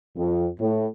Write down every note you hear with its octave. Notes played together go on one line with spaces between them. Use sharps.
F2
A2